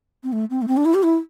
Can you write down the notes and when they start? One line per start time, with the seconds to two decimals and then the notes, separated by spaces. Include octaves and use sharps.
0.23 C4
0.32 A3
0.50 C4
0.62 A3
0.68 C4
0.77 D4
0.85 E4
0.94 G4
1.03 E4